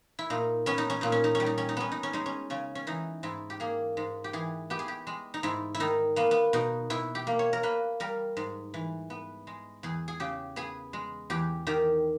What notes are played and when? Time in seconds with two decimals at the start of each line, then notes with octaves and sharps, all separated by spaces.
0.19 E4
0.30 A#2 D#4
0.66 B3 C#4
0.78 D#4
0.90 C#4
1.01 A#2 D#4
1.12 C#4
1.24 D#4
1.35 C#4
1.40 G3
1.46 D#4
1.58 C#4
1.69 D#4
1.77 B3 C#4
1.92 D#4
2.03 C#4
2.13 G#3 D#4
2.26 C#4
2.50 C#3 C#4
2.75 C#4
2.87 E3 D#4
3.23 G#2 E4
3.50 G4
3.60 A#3 G#4
3.97 G#2
4.24 G4
4.33 E3 G#4
4.70 B3 G4
4.79 G#4
4.88 G4
5.07 G#3
5.34 D#4
5.43 G#2 E4
5.75 E4
5.80 D#3 D#4
6.16 A#3 B3
6.31 B3
6.53 B2 D#4
6.90 B2 E4
7.15 G4
7.27 A#3
7.39 C#5
7.53 A#4
7.63 A#3 B4
8.00 G3 A#4
8.37 G#2
8.74 E3
9.10 B3
9.47 G#3
9.83 E2 G#4
10.08 G#4
10.20 C#3 G4
10.56 B3 G#4
10.93 G#3
11.30 E2 G4
11.67 D#3 G4